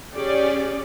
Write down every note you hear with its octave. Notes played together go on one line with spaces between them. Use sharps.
C#4 G4 G#4 D5